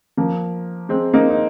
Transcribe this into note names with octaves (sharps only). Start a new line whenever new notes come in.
F3 A#3
G#3 C4
A#3 D#4
D#4